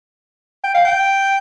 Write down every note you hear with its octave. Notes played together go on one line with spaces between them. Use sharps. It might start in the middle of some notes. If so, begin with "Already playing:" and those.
G5
F5
G5